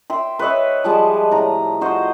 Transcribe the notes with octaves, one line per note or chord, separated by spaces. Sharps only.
E5 G5 C6
B4 C#5 D#5 E5
F3 G3 G#3 A5
A2 A#5
F#4 C5 D#5